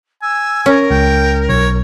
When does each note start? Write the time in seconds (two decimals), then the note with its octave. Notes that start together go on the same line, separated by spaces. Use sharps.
0.22 G#5 E6
0.66 C#4 A#4
0.91 C#2 G5
1.49 B1 C#5